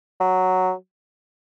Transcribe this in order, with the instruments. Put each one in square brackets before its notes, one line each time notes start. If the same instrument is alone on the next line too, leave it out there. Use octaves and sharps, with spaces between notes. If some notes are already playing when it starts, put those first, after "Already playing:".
[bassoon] F#3